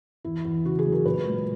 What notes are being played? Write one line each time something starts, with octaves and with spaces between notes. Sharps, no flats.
E2 E4
E2
C#3 F#4
G#4
F#3
A#4
A#2 B4
G#3